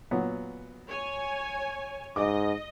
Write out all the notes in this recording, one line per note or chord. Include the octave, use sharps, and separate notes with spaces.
A#2 F#3 B3
C#5 G#5
G#2 D#5 D6